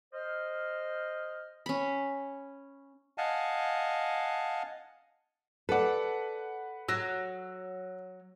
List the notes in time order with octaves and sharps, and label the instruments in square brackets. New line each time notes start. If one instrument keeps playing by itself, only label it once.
[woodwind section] C5 D#5 F6
[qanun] C#4 B5
[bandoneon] D#5 F5 F#5 G#5 A5
[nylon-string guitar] A4 D5 [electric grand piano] B4 F#5
[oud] F#3 [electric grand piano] E6 A#6